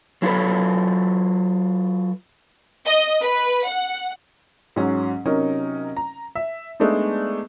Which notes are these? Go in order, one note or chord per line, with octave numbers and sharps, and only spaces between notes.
F#3 E4 F4 A4 B4
D#5
B4
F#5
G#2 F#3 C#4
C3 F#3 C#4 D#4 A#4
A#5
E5
G#3 A3 B3 D4 D#4